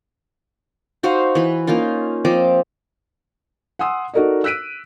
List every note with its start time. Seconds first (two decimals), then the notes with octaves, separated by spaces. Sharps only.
1.03 D#4 F#4 C5 F5
1.35 E3 B4
1.67 A#3 C#4 D#4 F4
2.25 F3 C4 D#5 D6
3.79 F#5 G#5 C6 D#6 E6
4.14 D#4 F#4 A4 A#4 D5 D#5
4.44 E6 F#6 B6 D7 D#7